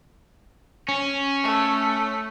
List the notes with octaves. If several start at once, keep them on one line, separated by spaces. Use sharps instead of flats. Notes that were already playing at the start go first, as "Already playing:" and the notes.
C#4
A3